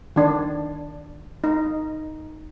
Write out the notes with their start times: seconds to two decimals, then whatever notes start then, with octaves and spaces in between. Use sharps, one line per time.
0.16 D#3 D4
1.44 D#4